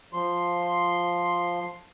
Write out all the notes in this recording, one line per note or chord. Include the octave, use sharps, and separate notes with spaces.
F3 C6